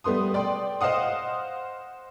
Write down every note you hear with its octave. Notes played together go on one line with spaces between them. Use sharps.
G3 A3 B3 C6 D#6
D5 G5 C6
C5 D#5 F5 F#5 D#6